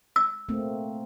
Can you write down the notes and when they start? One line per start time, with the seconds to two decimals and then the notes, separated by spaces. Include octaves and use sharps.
0.16 E6
0.49 A3 A#3 C4